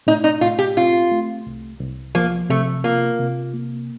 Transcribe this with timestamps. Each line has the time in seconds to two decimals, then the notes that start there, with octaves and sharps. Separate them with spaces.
0.07 A2 D#4
0.24 D#4
0.41 A2 F4
0.59 G4
0.77 C4 F4
1.11 A3
1.47 C2
1.80 C2
2.15 F3 A#3
2.50 C3 A3
2.84 A#3 F4
3.19 C3
3.54 A#3